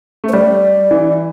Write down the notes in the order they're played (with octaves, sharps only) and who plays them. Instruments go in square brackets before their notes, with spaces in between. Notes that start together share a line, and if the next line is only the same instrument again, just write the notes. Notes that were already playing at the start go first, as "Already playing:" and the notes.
[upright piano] A3
[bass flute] C5
[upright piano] G3 [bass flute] D5
[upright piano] E3